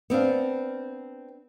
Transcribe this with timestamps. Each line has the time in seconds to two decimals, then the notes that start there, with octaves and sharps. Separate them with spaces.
0.10 B3 C4 D4 F5